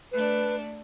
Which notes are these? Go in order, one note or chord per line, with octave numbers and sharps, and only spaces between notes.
A3 D4 B4